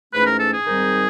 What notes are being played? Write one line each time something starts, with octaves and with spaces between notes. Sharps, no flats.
G#2 E3 A3 C#4 B4
A#4
A4
G#4
G#2 D#3 G3 C4 D#4